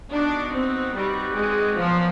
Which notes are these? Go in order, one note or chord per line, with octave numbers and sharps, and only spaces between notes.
B3 D4 D#4 F#4
C4
G3 C4 D#4 F#4 B4 D5
G#3
A#2 F3 F#3 B3